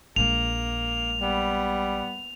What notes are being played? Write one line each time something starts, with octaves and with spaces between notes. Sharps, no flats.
A#1 G#3 A#3 F7
G3 B3